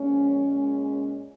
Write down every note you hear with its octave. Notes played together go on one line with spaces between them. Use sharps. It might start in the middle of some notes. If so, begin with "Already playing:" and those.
Already playing: A#2 F3 G#3 C#4
A#2 G#3